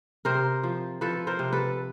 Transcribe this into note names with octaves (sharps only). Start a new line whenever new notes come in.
C3 A#4 C5
F3
F3 A4 B4
A#4 C5
C3
A4 B4